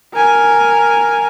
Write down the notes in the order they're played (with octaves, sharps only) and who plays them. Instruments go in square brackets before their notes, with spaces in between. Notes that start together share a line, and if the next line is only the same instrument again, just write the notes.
[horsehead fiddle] A#4 G#5